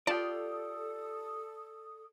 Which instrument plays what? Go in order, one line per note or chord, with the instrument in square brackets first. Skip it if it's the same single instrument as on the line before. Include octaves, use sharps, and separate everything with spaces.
[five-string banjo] F4 G4 [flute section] A4 D#6 [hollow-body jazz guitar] D5 [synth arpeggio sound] A5